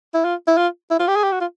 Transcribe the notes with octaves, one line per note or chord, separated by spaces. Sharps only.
E4
F4
E4
F4
E4
F4
G4
G#4
G4
F#4
F4